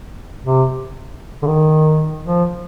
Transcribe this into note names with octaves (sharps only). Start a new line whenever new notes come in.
C3
D3
D#3
F3